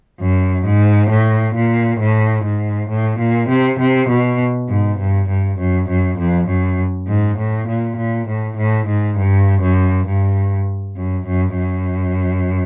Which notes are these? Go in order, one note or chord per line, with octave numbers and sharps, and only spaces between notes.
F#2
G#2
A2
A#2
A2
G#2
A2
A#2
C3
C3
B2
G#2
G2
G2
F#2
F#2
F2
F#2
G#2
A2
A#2
A#2
A2
A2
G#2
G2
F#2
G2
F#2
F#2
F#2